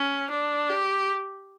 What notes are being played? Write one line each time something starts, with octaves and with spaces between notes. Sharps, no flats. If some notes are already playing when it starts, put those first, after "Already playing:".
Already playing: C#4
D4
G4